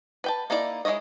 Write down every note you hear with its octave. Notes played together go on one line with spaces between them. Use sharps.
B4 G5 A5
A#3 D#4 E4 A4 D5
G#3 B3 E4 C#5 D#5